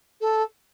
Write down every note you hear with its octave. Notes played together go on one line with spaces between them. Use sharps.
A4